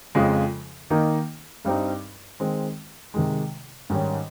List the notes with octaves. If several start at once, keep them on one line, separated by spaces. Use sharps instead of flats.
F2 C#3 F3 G#3
D#3 A#3 D#4
G2 G3 C4 D#4
D#3 G#3 C4
C3 D#3 G#3
G#2 D#3 G3 C#4